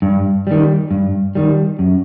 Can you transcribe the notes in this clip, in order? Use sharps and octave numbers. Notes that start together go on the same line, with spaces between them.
G2
D#3 G3
G2
D#3 G3
F#2